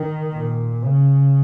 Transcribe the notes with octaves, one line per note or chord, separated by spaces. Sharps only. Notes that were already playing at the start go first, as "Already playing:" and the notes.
Already playing: D#3
A#2
C#3